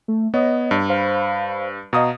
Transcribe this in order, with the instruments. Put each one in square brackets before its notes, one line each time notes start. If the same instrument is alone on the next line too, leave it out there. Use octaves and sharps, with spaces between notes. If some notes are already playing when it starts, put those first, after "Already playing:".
[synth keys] A3
[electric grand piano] B3 [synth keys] C#5 D#5
[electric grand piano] G2
[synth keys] C5 F5 B5
[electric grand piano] B2 D#6 [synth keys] D#5 F5 A#5